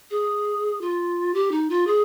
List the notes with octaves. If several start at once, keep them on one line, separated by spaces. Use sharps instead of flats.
G#4
F4
G4
D#4
F4
G#4